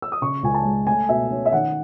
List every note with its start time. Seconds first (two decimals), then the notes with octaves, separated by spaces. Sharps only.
0.02 E6
0.12 D#6
0.22 C#3 C#6
0.43 C#2 G#5
0.54 A5
0.65 G#3
0.87 A3 G#5
1.09 B2 E5
1.31 C#4
1.46 E5
1.52 D#3 F#5